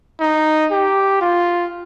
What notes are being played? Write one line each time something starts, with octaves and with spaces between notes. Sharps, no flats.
D#4
G4
F4